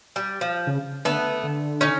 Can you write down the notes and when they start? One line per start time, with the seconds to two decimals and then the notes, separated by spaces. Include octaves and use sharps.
0.16 G3
0.41 F3
0.67 C#3
1.05 D3 A3 B3
1.43 D3
1.81 C#4 D#4